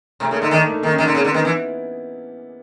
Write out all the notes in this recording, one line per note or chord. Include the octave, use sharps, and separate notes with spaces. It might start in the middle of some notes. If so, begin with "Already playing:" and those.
C3 A3
C#3 A#3
D3 D#4
D#3 D4
A3
D#3 A#3
C#4
D#3 D4
D3
C#3 C4
D3
D#3 B3
E3 B3